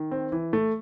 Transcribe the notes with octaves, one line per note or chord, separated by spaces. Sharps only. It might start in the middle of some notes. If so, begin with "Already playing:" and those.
Already playing: D#3
C4
E3
A3